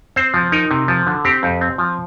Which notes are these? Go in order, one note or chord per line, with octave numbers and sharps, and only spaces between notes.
C4 C5
F3
D#4 A#4
C3
F3
D3
C4 G4
F2
C4
F3